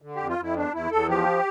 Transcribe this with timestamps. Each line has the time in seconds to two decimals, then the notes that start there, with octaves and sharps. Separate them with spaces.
0.02 D3
0.15 F2 G4
0.29 F4
0.38 F2 E4
0.55 E2 D4
0.73 E2 E4
0.91 E2 A4
1.09 F3 G4